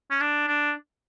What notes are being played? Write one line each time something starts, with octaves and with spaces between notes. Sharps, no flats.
C#4
D4
D4